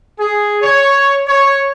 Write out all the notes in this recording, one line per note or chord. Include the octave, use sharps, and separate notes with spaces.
G#4
C#5
C#5